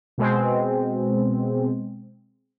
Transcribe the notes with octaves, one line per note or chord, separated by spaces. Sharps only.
B2 G#3 C4